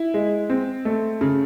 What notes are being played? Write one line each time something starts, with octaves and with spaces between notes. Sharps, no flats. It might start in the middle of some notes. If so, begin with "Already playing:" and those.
Already playing: E4
G#3
C4
A3
C#3